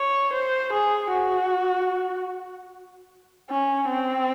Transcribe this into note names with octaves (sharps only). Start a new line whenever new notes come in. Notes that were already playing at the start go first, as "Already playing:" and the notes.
Already playing: C#5
C5
G#4
F#4
C#4
C4